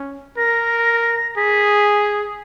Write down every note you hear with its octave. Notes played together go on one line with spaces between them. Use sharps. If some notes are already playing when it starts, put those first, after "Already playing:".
Already playing: C#4
A#4 A#6
G#4 B6